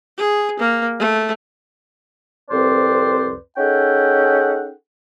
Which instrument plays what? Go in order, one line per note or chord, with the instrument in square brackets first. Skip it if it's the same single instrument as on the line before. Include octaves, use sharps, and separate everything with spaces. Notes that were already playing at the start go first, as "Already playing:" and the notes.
[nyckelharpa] G#4
A#3
A3
[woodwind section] C2 F2 C4 B4 C5 D5
C#4 D#4 G#4 A4 F#5 G5